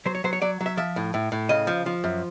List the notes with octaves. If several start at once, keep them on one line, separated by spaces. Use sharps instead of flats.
F#3 C5
C#5
F#3 C5
C#5
F#3 D5
F#3
E5
F3 E5
A2
A2
A2
C#3 D#5
F3
F3
F#2